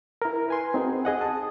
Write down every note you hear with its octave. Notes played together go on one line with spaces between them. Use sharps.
E4 A#4
B4 G#5 C6
C4 D#4 F#4 G#4
G#4 D#5 F#5
A5 D#6